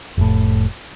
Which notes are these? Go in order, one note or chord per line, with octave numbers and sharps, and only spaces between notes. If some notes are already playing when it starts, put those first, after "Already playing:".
F1 A2